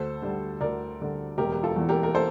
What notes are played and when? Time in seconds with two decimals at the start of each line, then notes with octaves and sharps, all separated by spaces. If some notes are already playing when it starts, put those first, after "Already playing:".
Already playing: D2 A4 C5
0.22 D3 G3
0.61 D2 A#4 D5
1.00 D3 G3
1.38 E1 G4 A#4
1.52 G4
1.63 F4 A4
1.76 E2 E3
1.89 G4 A#4
2.03 A#4
2.15 A4 C5